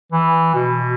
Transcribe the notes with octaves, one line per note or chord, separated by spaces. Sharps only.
E3
B2